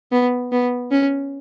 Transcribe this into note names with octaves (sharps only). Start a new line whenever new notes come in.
B3
B3
C#4